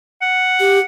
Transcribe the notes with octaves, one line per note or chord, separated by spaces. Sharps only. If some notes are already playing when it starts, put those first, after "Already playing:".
F#5
G4